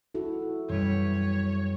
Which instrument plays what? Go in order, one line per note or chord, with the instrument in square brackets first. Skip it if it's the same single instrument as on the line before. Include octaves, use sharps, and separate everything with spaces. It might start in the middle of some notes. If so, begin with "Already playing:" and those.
[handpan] E4 F#4 A4
[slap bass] F#2 E3 F#3 [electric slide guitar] B2 G3 B4 [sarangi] C#5